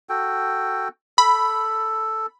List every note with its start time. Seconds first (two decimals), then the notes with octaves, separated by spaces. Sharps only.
0.09 F#4 A4 G5
1.18 A4 B5